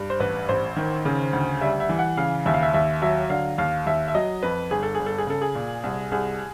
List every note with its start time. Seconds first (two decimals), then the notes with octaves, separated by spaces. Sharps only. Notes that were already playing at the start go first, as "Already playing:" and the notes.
Already playing: G2
0.10 C5
0.20 A1 B4
0.49 A1 C5
0.77 D#3
1.05 C#3
1.33 D2
1.61 G3 E5
1.80 E5
1.89 E3
1.99 F#5
2.17 C#3 F5
2.46 D#2 E5
2.54 F5
2.62 E5
2.74 D#2 E5
3.02 F#3 E5
3.30 D3 F5
3.58 D#2 F5
3.86 D#2 E5
4.08 E5
4.15 F#3 D#5
4.43 F2 B4
4.71 G1 G#4
4.83 A4
4.95 G1 G#4
5.06 A4
5.18 G#4
5.27 C#3 A4
5.41 G#4
5.55 A#2
5.84 C2
6.12 C2 G#4